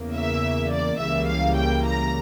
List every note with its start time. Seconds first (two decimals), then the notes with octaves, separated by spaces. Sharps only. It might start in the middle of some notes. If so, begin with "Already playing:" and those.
Already playing: E2 C#3 E3 A#3
0.15 E5
0.72 D5
1.00 C#2 C#3 E3 G3 A#3 E5
1.28 F5
1.57 G5
1.86 A#5